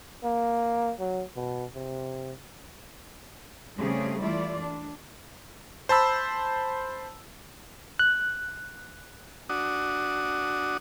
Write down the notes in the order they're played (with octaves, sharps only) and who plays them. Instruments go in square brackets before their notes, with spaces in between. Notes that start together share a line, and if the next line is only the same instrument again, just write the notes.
[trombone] A#3
F#3
B2
C3
[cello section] C#3 G3 A3 C4 C#4 G#4
E3 A3 E4 F4 D5
D4
[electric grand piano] C5 A5 B5 E6
[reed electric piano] F#6
[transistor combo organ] D4 F#4 D#6